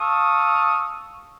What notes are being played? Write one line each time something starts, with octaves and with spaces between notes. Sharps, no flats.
F5 A5 C#6 D#6 E6